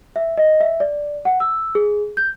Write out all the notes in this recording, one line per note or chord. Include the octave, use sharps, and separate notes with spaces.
E5
D#5
E5
D5
F#5
E6
G#4
G6